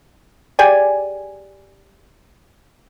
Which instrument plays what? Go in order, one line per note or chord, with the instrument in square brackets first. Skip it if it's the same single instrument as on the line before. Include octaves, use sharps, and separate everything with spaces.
[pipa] G4 G#4 D5 G#5